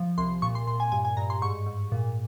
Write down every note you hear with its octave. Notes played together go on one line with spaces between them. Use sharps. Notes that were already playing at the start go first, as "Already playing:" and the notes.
Already playing: F3
C2 C6
A#2 C#6
C6
A#2 C6
G#5
G2 G#5
G#5
G2 A#5
C6
G#2 C#6
G#2
A#2